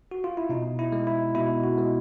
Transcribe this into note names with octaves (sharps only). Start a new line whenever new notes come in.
F#4
F4
E4
B2 D#4
E4
G#3
E4
B2 E4
F#4
G#3